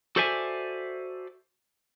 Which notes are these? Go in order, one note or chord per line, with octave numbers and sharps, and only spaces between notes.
F#4 A4 C5 D5 E5 G#5